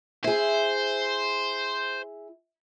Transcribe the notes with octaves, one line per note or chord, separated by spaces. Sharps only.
E4 G#4 C5